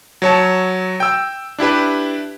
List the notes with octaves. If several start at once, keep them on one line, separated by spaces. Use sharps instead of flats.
F#3 C#5 A5
G5 E6
D4 E4 G4 B4